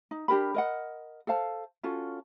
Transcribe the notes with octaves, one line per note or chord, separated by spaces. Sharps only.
D#4
D4 G4 A#4 B5
A#4 D#5 F#5
A4 C5 F5 A5
C#4 F4 F#4 A4